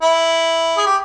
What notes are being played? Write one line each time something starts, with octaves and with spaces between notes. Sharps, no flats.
E4
G#4
G4